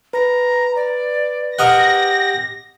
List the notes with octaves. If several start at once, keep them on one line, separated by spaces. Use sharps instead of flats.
B4 A#5
D5
G4 A#4 D#5 F#5 A#6